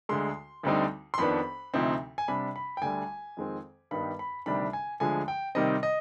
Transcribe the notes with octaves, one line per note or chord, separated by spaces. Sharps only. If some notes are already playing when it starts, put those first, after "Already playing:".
D2 D3 G#3 C6
D2 D3 G3 C4 D#4
C6
F2 D#3 B3 D4 B5
D2 C3 F3 C4 D#4
G#5
C3 G3 D4 B5
B5
G5
D2 D3 G3 G#5
F2 D#3 G#3 C4
G2 D#3 G3 B3 D#4 B5
B5
D2 C3 D#3 G3 D4 B5
G#5
D2 D3 F3 G#3 G#5
G5
C3 D#3 G3 C4 D#5
D#5